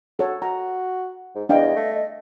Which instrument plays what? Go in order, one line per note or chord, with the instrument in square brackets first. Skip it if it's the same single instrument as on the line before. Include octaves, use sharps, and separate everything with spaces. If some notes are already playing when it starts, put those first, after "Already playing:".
[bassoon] F#4 [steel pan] A4 C#5
[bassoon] F#4 [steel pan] A#5
[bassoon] G#2
[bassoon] E2 [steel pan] D4 F5 G5 [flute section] D#5
[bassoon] A3